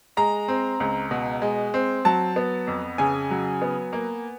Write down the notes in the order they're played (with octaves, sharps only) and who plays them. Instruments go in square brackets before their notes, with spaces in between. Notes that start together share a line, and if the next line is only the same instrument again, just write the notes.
[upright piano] G#3 A#5
C4
C#2
B2
G#3
C4
F#3 A5
B3
F2
C#3 G#5
F#3
B3
A#3